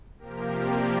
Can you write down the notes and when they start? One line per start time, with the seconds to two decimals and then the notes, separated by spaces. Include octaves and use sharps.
0.19 C3 F3 A#3 G4 A#4
0.51 A#4 D5